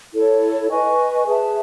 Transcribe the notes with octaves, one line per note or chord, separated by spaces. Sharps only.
E4 A4 C#5
B4 D#5 G#5 C#6
G#4 B4 E5 A5